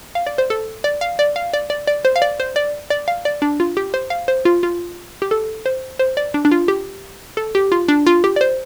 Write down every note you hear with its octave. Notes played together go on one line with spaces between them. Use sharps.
F5
D5
C5
A4
D5
F5
D5
F5
D5
D5
D5
C5
F5
D5
C5
D5
D5
F5
D5
D4
F4
G4
C5
F5
C5
F4
F4
G4
A4
C5
C5
D5
D4
D4
F4
G4
A4
G4
F4
D4
F4
G4
D5
C5